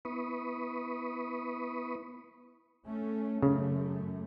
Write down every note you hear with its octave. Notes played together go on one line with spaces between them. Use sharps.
B3 E4 B4 B5 C#6 D#6
A3 C#4
F#2 C#3 A3